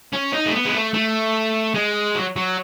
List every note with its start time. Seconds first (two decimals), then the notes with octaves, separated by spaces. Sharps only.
0.13 C#4
0.33 D#4
0.46 A3
0.53 B3
0.65 G#3
0.73 A3
0.93 A3
1.74 G#3
2.15 F#3
2.36 F#3